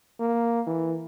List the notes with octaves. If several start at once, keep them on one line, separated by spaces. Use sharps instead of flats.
A#3
E3